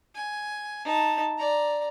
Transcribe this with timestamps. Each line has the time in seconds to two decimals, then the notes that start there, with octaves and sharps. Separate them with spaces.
0.15 G#5
0.85 D#4 A5
1.38 D5 A#5